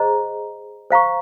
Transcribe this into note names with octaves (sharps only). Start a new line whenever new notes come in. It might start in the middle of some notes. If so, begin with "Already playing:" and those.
Already playing: G#4 C5 D#5 A#5
C5 F5 A#5 C#6